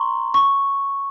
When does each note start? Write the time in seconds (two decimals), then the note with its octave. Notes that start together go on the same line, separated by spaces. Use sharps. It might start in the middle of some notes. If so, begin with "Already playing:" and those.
Already playing: A#5 C6 C#6
0.34 C#6